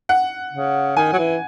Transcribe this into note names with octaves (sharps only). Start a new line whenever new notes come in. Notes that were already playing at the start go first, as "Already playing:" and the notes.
F#5
C#3
D#3 G#5
F#3
E3